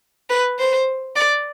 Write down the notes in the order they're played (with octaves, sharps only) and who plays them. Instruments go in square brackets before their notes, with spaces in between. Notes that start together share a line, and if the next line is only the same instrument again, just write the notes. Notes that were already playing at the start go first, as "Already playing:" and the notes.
[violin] B4
C5
D5